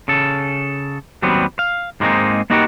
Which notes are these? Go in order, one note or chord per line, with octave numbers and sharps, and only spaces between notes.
C#3 A4
D#2 F#3 G3 B3 C4
F5
G#2 G3 G#3 A#3 C4 D#4
A#3 B3 D#4 F#4 G4 A#4